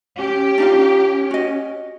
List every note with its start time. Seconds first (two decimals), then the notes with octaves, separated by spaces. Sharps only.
0.19 C#4 G4
0.58 D4 D#4 F4
1.31 F#4 D#5